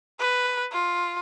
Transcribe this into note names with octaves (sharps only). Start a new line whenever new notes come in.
B4
F4